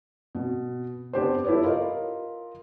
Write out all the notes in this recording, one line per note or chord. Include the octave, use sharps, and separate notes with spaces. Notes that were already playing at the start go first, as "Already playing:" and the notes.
B2
B3 D4 G4 C5
E4 G4 A4 B4 C#5
F4 A#4 D#5